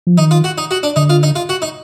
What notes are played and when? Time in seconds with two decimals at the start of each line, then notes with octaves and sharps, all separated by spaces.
0.07 F3
0.18 D#3 D#4
0.31 F4
0.44 F#4
0.58 D#4
0.71 F#4
0.83 D4
0.96 D3 D#4
1.10 F4
1.23 D#4
1.36 F4
1.49 F#4
1.62 D#4